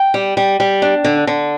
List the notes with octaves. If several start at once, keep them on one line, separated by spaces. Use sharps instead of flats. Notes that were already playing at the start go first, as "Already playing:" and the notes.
Already playing: G5
G3
G3
G3
D4
D3
D3